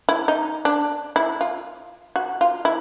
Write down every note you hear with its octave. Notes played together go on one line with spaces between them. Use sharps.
E4
D#4
D4
E4
F4
F#4
F4
E4